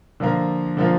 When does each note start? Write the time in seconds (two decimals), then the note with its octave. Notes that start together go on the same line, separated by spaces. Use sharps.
0.20 D3 F3 A#3 F4 A#4
0.77 D3 F3 A#3 F4 A#4